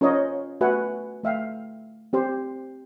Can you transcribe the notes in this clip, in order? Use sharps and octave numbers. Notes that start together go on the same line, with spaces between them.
C#4 F4 A#4 C5 C#5 D#5
A3 F#4 B4 E5 F#5 G#5
A3 E5 F5 G5
C4 G4 C5